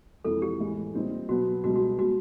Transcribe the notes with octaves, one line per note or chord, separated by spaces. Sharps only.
F2 C3 E3 G#3 A4
G4
A2 E3 G#3
A#2 G3 C4 D#4
B2 F#3 B3 F#4
C#2 B2 G3 F#4
F#4
B2 G#3 B3 F#4